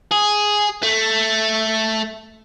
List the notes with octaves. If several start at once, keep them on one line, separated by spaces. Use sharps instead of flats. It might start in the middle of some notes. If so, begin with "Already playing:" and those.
G#4
A3